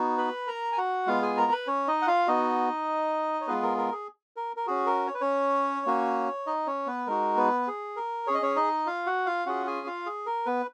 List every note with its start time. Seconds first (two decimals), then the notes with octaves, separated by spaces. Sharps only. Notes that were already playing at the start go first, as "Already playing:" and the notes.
Already playing: B3 D#4 F#4
0.18 B4 B5
0.47 A#4 A#5
0.72 G#5
0.78 F#4 F#5
1.07 G#3 B3 F4 F5
1.22 G#4 G#5
1.37 A#4 A#5
1.52 B4 B5
1.67 C#4 C#5
1.87 D#4 D#5
2.02 F#5
2.07 F4 F5
2.27 B3 D#4 F#4 D#5
3.41 C#5
3.47 G#3 B3 F4 G#4 B4
3.63 A#4
3.78 A#4
3.92 G#4
4.37 A#4
4.56 A#4
4.67 C#4 F#4 G#4
4.86 A#4
5.07 C#5
5.14 B4
5.21 C#4 C#5
5.86 A#3 C#4 F#4
6.46 D#4 D#5
6.67 C#4 C#5
6.87 B3 B4
7.07 G#3 D#4 F#4 A#4
7.36 B3 B4
7.67 G#4
7.96 A#4
8.27 C#4 G#4 C#5
8.34 D#5
8.42 C#4 C#5
8.56 D#4 D#5
8.86 F4 F5
9.06 F#4 F#5
9.26 F4 F5
9.46 C#4 F4 F#4 G#4 F#5
9.67 G#4 G#5
9.87 F4 F5
10.06 G#4
10.26 A#4
10.46 B3 B4